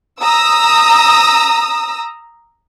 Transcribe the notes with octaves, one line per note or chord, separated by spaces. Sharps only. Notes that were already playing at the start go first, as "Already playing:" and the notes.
A#5 D#6 E6